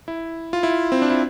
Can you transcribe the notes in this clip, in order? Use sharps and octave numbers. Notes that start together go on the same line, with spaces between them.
E4
F4
E4
C4
D4
E4